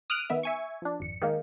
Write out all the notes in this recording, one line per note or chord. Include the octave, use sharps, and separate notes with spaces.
D#6 F6 F#6 D7
D#3 B3 E5
E5 G#5 C#6
F3 D4
G#1 F2 C#7
D#3 G#3 A#3 D#4